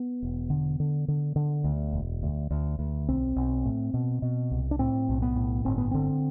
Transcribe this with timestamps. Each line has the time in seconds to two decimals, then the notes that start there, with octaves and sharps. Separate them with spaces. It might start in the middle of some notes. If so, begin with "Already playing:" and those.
Already playing: B3
0.22 E1
0.50 D3
0.80 D3
1.08 D3
1.36 D3
1.64 D2
1.93 E1
2.23 D2
2.51 D2
2.79 D2
3.08 B1 C4
3.36 B1
3.65 A2
3.94 B2
4.22 B2
4.51 C2
4.71 D4
4.79 A2 C4
5.09 B1
5.22 B3
5.36 A2
5.65 G1 C4
5.78 B3
5.91 D3 C4